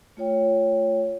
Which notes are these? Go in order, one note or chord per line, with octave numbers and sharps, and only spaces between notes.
A3 F4 C#5 G5